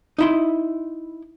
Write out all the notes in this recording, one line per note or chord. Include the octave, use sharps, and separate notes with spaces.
D#4 E4 C6